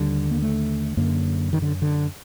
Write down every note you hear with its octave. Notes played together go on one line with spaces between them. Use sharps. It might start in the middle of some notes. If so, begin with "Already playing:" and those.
Already playing: D#2 D3 G3
A#3
A3
F#2 D3 A#3
D#3
D3
D3